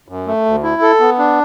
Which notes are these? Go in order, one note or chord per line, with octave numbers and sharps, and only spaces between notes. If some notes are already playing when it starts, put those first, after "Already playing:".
F#2
A3
D2
E4
A4
B3
D4